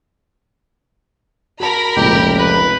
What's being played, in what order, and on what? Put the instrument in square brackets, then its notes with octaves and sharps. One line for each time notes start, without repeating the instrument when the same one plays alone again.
[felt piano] F#4 A5 [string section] A#4 B5
[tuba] F1 [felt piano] C#2 A#2 [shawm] G4
[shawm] B4